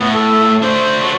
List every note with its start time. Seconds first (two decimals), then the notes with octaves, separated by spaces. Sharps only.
0.01 A2 B3
0.15 A4
0.62 A3 D4 C5
1.02 F#3 D4